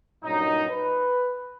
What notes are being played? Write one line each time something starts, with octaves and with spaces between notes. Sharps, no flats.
G2 A#2 F#3 C#4 D#4
B4